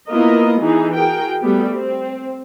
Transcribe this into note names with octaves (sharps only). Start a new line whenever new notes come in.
A#3 B3 E4 F4 A#4 D#5
E3 D#4 G#4
F#4 G#4 A#4 G5
G3 A3 B3 G4
C4